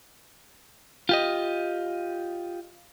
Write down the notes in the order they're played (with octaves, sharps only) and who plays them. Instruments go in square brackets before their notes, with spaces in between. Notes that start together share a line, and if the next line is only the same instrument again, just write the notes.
[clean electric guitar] F4 G4 D#5